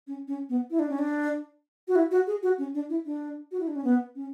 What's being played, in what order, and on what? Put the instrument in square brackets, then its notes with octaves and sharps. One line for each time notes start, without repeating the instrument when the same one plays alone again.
[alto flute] C#4
C#4
B3
E4
D4
C#4
D4
F#4
E4
F#4
G#4
F#4
C#4
D4
E4
D4
F#4
E4
D4
C#4
B3
C#4